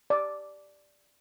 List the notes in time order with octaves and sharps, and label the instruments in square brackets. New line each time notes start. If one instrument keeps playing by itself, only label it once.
[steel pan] D5